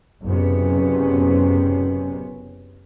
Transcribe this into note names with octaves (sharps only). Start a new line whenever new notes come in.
F#1 C3 B3 C#4